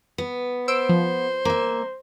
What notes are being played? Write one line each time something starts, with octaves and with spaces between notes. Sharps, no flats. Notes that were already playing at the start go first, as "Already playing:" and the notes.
B3
C5 E6 D7
F3
A#3 E5